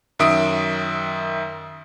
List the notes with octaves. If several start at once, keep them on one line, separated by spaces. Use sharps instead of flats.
F#2 D#3 E5 D#6 D7